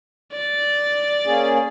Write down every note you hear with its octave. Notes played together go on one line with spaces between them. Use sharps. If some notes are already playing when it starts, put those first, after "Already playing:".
D5
A#3 C#4 G#4